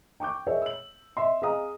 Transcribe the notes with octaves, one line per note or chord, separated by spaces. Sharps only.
G5 C#6 D6 G6
G#4 A#4 C#5 D#5 E5
E6 F#7
D#5 E5 C6
G#4 D#5 F5 A#5 D#6